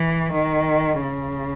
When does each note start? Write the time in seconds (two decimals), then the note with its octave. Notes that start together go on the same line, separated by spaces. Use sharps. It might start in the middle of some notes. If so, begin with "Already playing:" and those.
Already playing: E3
0.33 D#3
1.02 C#3